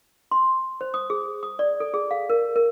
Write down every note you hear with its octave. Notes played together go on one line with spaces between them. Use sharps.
C6
C5
D#6
G#4
D#6
D5
A4
G#4
F5
A#4
A#4